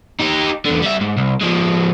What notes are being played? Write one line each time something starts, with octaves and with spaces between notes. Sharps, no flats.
D#4 G4
E2 D3
G3 E5
G#2
C2
F3 G#3